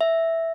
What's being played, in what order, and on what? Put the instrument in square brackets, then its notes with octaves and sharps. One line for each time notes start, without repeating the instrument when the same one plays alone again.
[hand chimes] E5